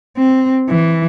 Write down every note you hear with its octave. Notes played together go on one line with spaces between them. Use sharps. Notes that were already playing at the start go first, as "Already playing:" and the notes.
C4
E3